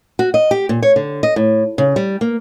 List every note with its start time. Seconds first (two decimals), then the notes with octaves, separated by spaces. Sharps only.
0.19 F#4
0.34 D#5
0.51 G4
0.69 A#2
0.83 C#5
0.96 D3
1.23 D#5
1.36 A2
1.78 C#3
1.96 G3
2.21 A#3